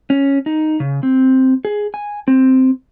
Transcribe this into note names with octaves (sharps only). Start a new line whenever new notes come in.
C#4
D#4
C#3
C4
G#4
G#5
C4